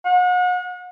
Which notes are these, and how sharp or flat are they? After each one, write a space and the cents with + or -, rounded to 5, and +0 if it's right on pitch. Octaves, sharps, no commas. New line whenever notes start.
F#5 -40